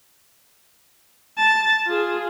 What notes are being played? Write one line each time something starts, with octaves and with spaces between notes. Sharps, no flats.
A5
F4 G#4